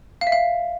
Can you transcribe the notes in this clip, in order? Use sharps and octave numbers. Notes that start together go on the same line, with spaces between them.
F5
E5
F5